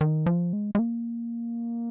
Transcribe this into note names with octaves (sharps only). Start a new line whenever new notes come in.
D#3
F3
G#3
G#3
A#3